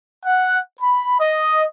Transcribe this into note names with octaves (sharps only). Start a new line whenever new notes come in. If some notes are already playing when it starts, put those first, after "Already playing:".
F#5
B5
D#5